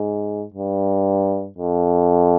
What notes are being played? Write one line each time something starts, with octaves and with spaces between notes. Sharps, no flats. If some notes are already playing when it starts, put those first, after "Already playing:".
Already playing: G#2
G2
F2